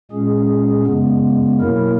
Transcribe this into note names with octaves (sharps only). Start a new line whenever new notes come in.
A#2 G#3 C#4 G#4
F#2 C#3 G#3 B3
B2 F#3 A#3 E4 A#4